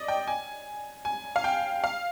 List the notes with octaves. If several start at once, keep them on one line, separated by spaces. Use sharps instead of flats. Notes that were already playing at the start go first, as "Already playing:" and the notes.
Already playing: D5 D#5
G5
G#5
G#5
F5
G5
F5